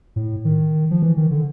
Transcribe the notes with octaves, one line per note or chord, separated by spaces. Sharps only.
A2
D#3
F3
E3
D#3
D3